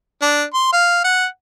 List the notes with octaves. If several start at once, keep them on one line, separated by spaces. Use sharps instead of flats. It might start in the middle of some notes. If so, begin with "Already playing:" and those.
D4
C6
F5
F#5